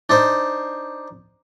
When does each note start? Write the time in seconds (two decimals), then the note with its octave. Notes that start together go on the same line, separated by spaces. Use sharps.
0.09 D4 D#4 C5